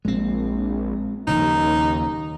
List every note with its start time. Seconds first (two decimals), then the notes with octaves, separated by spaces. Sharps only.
0.05 A#1 G#3 C4
1.27 D#1 D#2 C#3 F3 D#4